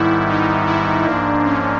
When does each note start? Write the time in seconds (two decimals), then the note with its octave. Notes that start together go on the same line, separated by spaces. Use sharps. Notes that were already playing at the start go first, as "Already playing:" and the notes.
Already playing: G#2 D#3 G3 B3 E4
0.28 D#4
0.67 E4
1.06 G#2 F3 A#3 D4
1.45 C#4